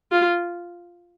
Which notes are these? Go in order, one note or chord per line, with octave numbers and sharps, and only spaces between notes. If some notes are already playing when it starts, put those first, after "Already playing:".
F4